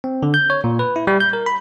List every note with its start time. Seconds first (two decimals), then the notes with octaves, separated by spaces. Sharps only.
0.04 C4
0.23 D3
0.34 G6
0.50 C#5
0.64 A#2
0.79 B4
0.96 E4
1.07 G3
1.20 G6
1.33 A#4
1.46 B5